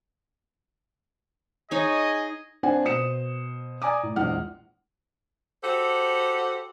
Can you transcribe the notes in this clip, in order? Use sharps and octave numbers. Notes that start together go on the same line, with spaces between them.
D#4 G#4 C#5 D#5
C4 D4 C5 F#5 G#5
B2 C5 D#6 C#7 E7
D5 G#5 A#5 D6 D#6
A2
A#1 E2 G#3 F#5 F6
F#4 G4 A4 C5 F#5